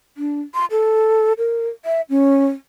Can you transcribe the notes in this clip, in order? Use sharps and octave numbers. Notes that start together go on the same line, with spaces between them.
D4
C6
A4
A#4
E5
C#4